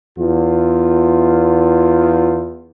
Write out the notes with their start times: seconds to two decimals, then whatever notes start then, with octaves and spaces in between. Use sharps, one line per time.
0.18 E2 F4